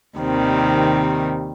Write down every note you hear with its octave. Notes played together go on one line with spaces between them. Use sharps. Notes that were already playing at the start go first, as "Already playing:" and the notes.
D#2 C3 D#3 G3 C4